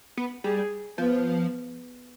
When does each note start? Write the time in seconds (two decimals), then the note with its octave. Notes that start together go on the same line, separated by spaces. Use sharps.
0.17 B3
0.44 G3 G#4
0.98 F3 B3